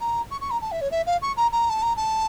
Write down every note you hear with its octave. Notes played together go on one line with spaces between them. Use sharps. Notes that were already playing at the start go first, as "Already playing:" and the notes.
A#5
C#6
C#6
A#5
A5
E5
C#5
E5
F5
C#6
A#5
A#5
A5
A#5
A5